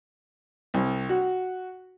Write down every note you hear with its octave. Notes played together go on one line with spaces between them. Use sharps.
C2
F#4